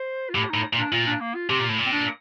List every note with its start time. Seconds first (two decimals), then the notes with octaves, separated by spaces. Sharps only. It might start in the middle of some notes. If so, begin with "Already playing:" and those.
Already playing: C5
0.30 F4
0.34 A2 G4
0.50 A2 D#4
0.73 A#2
0.78 D4
0.92 A#2 F4
1.07 D4
1.21 A#3
1.35 F4
1.49 C3 G4
1.59 A#2
1.69 A2
1.78 A#2
1.86 C4
1.93 D4